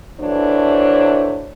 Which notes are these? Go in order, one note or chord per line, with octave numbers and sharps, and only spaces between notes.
E3 F#3 A3 D4 C5 C#5